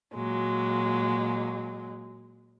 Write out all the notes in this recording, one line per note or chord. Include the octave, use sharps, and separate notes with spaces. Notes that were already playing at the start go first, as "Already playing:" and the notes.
A#2 F#3 G#3